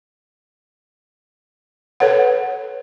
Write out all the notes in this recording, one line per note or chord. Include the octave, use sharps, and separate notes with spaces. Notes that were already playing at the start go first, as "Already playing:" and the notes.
A4 B4 C#5 F#5